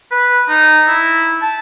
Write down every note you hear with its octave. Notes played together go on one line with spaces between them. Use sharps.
B4
D#4
E4
A5